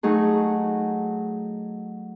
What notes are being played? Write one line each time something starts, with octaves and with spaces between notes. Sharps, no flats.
F#3 A3 D#4 G#4